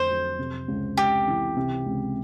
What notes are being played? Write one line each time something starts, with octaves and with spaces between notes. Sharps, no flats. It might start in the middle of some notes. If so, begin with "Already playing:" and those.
Already playing: F2 D3 A3 C5
F#3
C3
C#2
C#2 G4
E3
C3
C#2